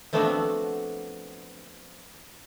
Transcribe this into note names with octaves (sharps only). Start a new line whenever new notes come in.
F3 A3 B3 C4 D4 F#4